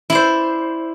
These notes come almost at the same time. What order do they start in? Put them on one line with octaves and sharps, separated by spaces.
E4 D5 C5